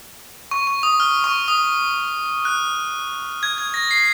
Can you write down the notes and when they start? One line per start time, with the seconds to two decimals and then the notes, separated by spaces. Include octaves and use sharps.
0.51 C#6
0.67 C#6
0.83 D#6
1.00 F6
1.24 C#6
1.48 D#6
2.45 F#6
3.43 G#6
3.58 G#6
3.74 A#6
3.91 C7